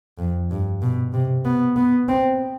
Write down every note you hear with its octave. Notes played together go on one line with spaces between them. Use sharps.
F2
G2
B2
C3
B3
B3
C4